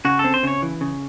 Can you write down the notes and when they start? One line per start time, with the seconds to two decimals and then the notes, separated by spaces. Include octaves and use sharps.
0.05 C#3 F#4
0.19 A4
0.24 C4
0.34 C5
0.43 C#3 C#5
0.62 E3
0.81 C#3